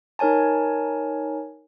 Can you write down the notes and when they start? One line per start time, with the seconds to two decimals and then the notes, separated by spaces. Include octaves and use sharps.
0.19 D#4 A#4 C#5 G#5 A5